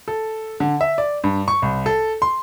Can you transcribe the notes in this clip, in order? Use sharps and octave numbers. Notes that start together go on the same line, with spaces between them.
A4
D3
E5
D5
G2
C#6
C2
A4
C6